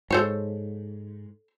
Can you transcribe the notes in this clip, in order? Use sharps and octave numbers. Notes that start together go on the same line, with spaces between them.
G#2 A4 C5 C#5